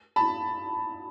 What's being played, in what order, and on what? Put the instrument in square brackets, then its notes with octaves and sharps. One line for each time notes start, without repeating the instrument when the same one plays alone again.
[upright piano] A5 B5